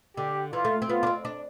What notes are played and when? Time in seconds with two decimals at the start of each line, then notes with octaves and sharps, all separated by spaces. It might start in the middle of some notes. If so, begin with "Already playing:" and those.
0.17 D3 G4
0.53 E3 F4
0.65 A3
0.82 C4
0.89 B3 F4
1.03 D4
1.07 C4
1.25 D4